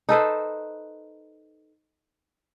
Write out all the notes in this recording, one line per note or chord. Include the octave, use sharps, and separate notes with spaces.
D#4 A4 B4 C5